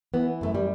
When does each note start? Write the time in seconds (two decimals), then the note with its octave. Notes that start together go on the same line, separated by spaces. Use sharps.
0.14 E3 B3
0.41 F#2 A3
0.55 G3